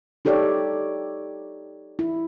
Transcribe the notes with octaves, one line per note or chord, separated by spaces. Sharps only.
D#4 G4 A4 C#5 D5
E4